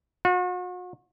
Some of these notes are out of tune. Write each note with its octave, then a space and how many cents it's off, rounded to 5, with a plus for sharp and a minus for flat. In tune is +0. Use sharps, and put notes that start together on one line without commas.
F#4 -40